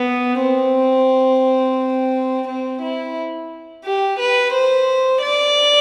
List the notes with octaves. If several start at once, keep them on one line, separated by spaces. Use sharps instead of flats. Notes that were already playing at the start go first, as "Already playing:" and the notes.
Already playing: B3
C4
C4
E4
G4
B4
C5
D5